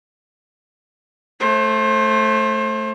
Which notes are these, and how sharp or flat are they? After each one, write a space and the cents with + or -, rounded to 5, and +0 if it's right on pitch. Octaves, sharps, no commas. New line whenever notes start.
A3 +0 C5 +30